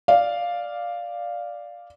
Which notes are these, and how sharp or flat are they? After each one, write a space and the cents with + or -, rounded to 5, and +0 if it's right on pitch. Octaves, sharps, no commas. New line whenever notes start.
D5 +0 F5 +0